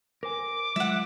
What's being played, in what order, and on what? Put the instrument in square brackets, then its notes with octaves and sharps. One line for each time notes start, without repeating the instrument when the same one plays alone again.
[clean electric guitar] A#4 C5 G#5 [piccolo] D6
[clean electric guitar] F#3 G#3 F4 [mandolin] E5 F#5